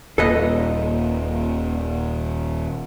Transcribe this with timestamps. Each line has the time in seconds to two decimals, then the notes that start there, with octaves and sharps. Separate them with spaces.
0.18 D#1 A#2 A4 B4 D#5